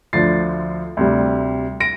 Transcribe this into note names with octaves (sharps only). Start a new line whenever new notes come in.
D2 D3 F3 A6 C7
D2 C3 G3
A#6 D7